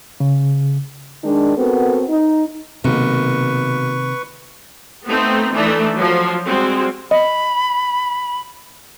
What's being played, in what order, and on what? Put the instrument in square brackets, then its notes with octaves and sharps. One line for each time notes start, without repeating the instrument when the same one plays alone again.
[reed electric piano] C#3
[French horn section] D#3 G#3 D4
B3 C4 F#4 A4 A#4
D#4
[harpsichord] B1 [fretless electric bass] C3 D#3 A#3 [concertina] B4 C#6
[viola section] A3 B3 C4 D#4
E3 A3 D4 D#4
F3 F#3
G3 G#3 C4 F#4
[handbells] D#5 [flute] B5